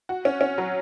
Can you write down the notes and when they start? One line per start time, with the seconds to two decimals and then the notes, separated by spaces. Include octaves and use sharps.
0.09 F#4
0.25 C#4
0.41 C#4
0.58 F#3